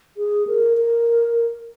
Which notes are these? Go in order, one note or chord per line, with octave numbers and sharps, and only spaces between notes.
G#4
A#4
A#4